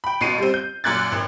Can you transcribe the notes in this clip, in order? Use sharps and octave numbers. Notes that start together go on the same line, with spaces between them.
G5 B5
A1 B2 C7 D#7
G3 C4
G6
F#2 A#2 F#6 G#6 A6
G#1